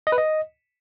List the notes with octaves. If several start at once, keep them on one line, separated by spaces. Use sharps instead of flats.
D#5
B4
D#5